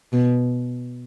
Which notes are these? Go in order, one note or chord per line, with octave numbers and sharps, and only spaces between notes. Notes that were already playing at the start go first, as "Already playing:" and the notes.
B2